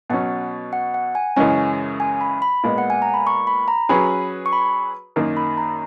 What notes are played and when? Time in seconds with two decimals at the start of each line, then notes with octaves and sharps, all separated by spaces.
0.09 B2 F#3 C#4 F#5
0.73 F#5
0.94 F#5
1.15 G#5
1.36 F#2 C#3 E3 G#3 C#4 G#5
2.00 G#5
2.21 B5
2.42 B5
2.63 A#2 G#3 B3
2.78 F#5
2.90 G#5
3.02 A#5
3.14 B5
3.27 C#6
3.47 B5
3.68 A#5
3.89 F#3 C#4 G#4 B4 B5
4.46 C#6
4.53 B5
5.16 F#2 D#3 A#3
5.37 B5
5.57 A#5